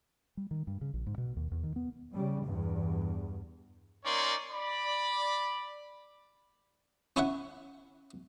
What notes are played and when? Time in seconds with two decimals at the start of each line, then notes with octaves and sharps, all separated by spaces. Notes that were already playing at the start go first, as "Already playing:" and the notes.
0.37 G3
0.51 D#3
0.67 G2
0.81 C#3
0.94 A#1
1.07 G#2
1.18 B2
1.37 D#2
1.52 E2
1.63 D#3
1.76 B3
2.14 C#3 G3
2.43 E2 G2
4.04 A#3 C#4 D#4 C#5 D5 C6
4.51 D5 B5
7.16 C#4 E4 C#5 E5 F#5